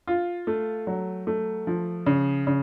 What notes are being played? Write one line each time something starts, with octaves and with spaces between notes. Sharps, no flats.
F4
A3
F#3
A3
F3
C#3
C#3